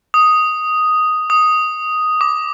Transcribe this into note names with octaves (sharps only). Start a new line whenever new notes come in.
D#6
D#6
D6